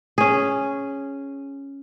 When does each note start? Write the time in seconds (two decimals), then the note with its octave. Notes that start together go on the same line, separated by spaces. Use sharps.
0.18 C#4 G#4